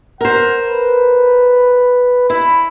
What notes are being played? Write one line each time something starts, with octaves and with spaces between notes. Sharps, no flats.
A#4 C5 F#5
B4
E4 B5